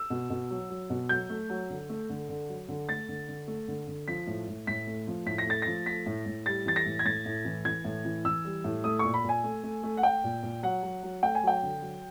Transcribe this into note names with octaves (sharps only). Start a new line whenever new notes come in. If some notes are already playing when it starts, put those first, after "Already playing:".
Already playing: E6
B2
B2
F#3
F#3
B2
F#3 G6
A3
F#3
D3
A3
D3
D3
F#3
D3
A3 A6
D3
D3
A3
D3
D3
F3 B6
A2
A2
A2 B6
A3
F3
A2 B6
A#6
A3 A6
F3 A#6
A3 B6
A2
A2
G3 A6
E3 A6
A#6
A2
G#6
A2 A6
A2
E3
E3 G#6
A2
E3
E3 E6
G3
A2
A3 D#6
A#2 C#6
B5
A#2 G#5
A3
A3
A3
F#5
A3 G5
A#2
A#2
F#3 F#5
F#3
F#3
A3 G5
G#5
F#3 G5
D3
F#3